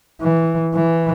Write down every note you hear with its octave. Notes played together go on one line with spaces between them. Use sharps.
E3
E3